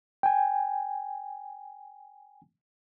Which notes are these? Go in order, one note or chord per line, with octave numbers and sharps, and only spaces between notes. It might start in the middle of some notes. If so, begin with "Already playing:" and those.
G5 G#5